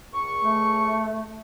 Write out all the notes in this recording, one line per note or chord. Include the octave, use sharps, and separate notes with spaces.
C#2 C#6
A3